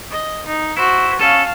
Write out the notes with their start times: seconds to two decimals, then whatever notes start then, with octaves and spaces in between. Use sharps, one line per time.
0.11 D#5
0.46 D#4
0.77 E4 F#4 C5
1.19 C#4 A4 F5 A5